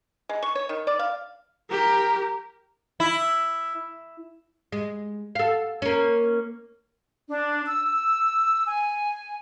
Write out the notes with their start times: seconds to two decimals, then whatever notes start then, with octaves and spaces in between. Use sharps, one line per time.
0.29 G#3
0.42 C#6
0.55 C#5
0.69 D#3
0.87 D5
0.99 F5
1.70 G4 A#4
3.00 E4
4.72 G#3
5.35 A4 F5
5.82 A#3 C#4
7.30 D4
7.67 E6
8.67 G#5